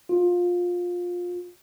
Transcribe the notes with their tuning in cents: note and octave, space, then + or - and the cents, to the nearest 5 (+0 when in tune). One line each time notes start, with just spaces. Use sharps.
F4 +20